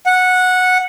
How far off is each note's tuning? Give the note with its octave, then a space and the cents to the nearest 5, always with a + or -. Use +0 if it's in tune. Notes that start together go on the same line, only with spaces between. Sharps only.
F#5 -10